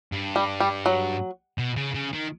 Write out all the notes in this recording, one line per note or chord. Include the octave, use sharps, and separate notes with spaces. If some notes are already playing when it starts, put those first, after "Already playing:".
G2
G3
G3
F#3
B2
C#3
C#3
D#3